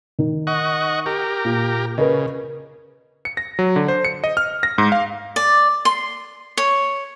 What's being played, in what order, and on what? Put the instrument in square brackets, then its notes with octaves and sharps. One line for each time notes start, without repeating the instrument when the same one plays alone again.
[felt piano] D#3
[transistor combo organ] D#5 F#5 C#6
G4 A#4
[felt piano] A#2
[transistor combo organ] C#3 [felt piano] A#4 B4 D#5
[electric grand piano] C#7
A#6
F#3
D3
C5
C#7
D#5
F6
A#6
G#2
F5
[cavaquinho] D5
C6
C#5